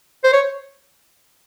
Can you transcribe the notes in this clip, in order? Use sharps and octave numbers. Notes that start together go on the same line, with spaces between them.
C5
C#5